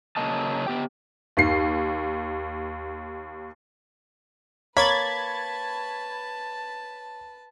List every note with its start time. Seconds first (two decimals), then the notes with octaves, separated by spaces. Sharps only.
0.17 C#3 F#3 A#3 D#5 A5
0.67 B3 G4 G5
1.37 D#2 C7
4.77 A#3 B4 C#5 A5 B5 G#6 A6